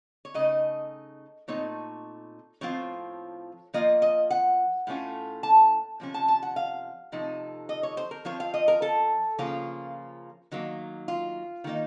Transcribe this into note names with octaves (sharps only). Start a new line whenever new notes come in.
C#5
C#3 A3 D#4 D#5
A#2 A3 C4 D#4 C#5
A2 F3 C4 F4 C#5
F3 A#3 F4 D#5
D#5
F#5
A2 A3 C#4 F4
A5
C3 F3 C#4
A5
A5
F#5
F5
C3 F3 A3 D#4
D#5
C#5
C5
A#4
F3 C4 F4 C#5
F5
D#5
A#4
A4
C#3 F3 A#3 C#4 F4
D#3 F#3 A#3
F4
D#3 A#3 D#4